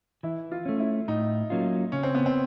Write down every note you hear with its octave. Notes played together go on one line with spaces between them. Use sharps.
E3 E4
F4
A3 C#4
E4
A2 D#4
F#3 A#3 C#4 F4
C#3 C#4
C4
B3
C4